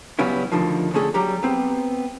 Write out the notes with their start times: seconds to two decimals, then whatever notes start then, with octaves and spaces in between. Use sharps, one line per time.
0.19 C#3 F#3 G3 B3 C#4 E4
0.52 D2 D3 D#3 F3
0.94 D3 A3 C#4 G#4 A4
1.14 F#3 G3 G4 A#5
1.43 B3 C4